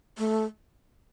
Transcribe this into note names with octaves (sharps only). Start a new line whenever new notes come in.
A3